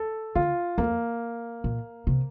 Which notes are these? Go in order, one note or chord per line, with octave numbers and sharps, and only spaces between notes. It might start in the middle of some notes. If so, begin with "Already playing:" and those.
Already playing: A4
D3 F4
F2 A#3
A#2
C3